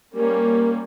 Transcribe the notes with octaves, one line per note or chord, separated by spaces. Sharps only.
G3 A#3 C#4 A#4